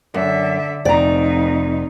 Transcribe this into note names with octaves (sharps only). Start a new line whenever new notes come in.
F#2 D3 E5
F1 F2 D#4 D5 A#5